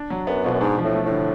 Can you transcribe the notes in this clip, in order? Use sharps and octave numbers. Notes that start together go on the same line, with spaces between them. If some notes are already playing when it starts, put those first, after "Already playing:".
Already playing: D4
F#3
F#2 B3
F2 B2
F#2
G#2 D4
F3
A2
A3
A2
D3